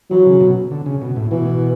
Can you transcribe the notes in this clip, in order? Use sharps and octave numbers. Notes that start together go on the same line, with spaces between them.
E3 F#3
C#3
B2
D3
C#3
B2
A2
B2 E3